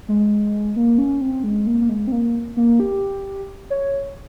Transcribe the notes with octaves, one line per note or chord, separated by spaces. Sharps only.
G#3
A#3
C#4
C4
G#3
A#3
A#3
G#3
C4
A#3
A#3
G4
C#5